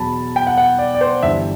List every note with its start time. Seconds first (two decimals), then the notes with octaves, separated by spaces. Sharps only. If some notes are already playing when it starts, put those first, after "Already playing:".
Already playing: E2 B2 F#3 A5 B5
0.36 G5
0.47 F#5
0.58 F#5
0.78 D5
0.95 D5
1.01 C5
1.23 G1 G2 E3 E5